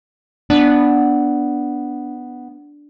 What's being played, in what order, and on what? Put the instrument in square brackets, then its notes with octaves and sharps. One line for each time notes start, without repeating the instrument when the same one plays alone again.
[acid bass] B3 [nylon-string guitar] D4